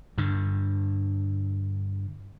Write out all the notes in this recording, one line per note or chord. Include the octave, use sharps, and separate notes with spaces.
G2 D3